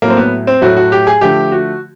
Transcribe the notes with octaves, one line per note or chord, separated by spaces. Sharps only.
A2 F#3 A3 A#3
C4
B3
C4
A2 F#3 A3 F#4
F#4
G4
G#4
D3 F3 A3 G4
F#4